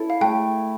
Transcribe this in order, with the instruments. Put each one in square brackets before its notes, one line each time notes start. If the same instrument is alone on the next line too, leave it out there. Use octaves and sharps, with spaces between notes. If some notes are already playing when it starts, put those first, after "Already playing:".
Already playing: [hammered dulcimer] E4 A4
[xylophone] F5
[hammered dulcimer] A3 [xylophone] G5